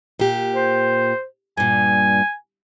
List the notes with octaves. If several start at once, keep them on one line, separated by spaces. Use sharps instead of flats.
A#2 G4
C5
G2 A#2 G#5